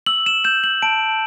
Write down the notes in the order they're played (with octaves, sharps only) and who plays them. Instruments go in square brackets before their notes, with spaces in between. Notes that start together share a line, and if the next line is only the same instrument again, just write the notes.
[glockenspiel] E6 F#7
E7
G6 E7
F#7
A5 D7